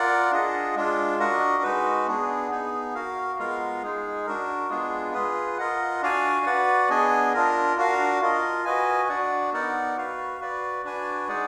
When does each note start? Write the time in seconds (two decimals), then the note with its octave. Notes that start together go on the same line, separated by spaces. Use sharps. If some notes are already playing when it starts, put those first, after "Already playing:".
Already playing: F4 A#4 D5 F#5
0.32 D4 F4 G#4 D#5 F#5
0.75 G#3 D4 F4
1.19 D4 F#4 A#4 D#5 F#5
1.63 G#3 D#4 F#4 B4
2.07 B3 D4 G#4
2.51 B3 D#4 G#4
2.95 F#4 A#4 F5
3.39 G#3 B3 F4 A#4 F5
3.83 G#3 D#4 G#4
4.26 D4 F#4 A#4
4.70 G#3 B3 D4 F4 G#4
5.14 F4 G#4 B4
5.58 F4 A#4 D#5 F#5
6.02 D4 F#4 D5 F5 G#5
6.46 F#4 B4 D5 F#5
6.89 B3 D4 G#4 D#5 G#5
7.34 D4 F4 A#4
7.77 D4 F#4 A#4 F5
8.21 F4 A#4 D#5
8.65 F#4 B4 D#5 G#5
9.09 D4 F#4 D5 F#5
9.53 B3 D#4 A#4 D5 F#5
9.97 F#4 B4 F5
10.40 F#4 B4 D5
10.84 D4 F#4 B4 D5 G#5
11.28 G#3 D#4 G#4 D5 F#5